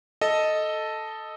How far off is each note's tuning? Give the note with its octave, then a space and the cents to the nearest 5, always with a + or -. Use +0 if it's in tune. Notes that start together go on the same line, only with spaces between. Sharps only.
A4 +0 D#5 +0